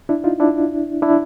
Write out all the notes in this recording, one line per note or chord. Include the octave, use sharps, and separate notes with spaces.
D4 E4
D#4 F4
D4 E4
D4 E4